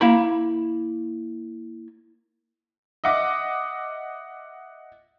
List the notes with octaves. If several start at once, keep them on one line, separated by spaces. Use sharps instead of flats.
A#3 E4 B5
D#5 E5 F#5 D6 D#6